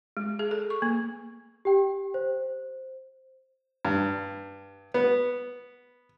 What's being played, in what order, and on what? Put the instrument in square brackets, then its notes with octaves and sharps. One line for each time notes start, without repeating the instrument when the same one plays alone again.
[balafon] G#3
G#4
A4
C#6
A#3
[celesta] G4 G5
C5
[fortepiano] G2
B3